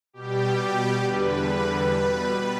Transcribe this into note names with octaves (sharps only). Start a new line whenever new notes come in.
B2 G3 G4
E2 D3 G3 B4
B2 G3 B4